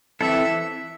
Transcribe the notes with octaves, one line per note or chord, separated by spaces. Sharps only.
E3 C4 E4 A4 E5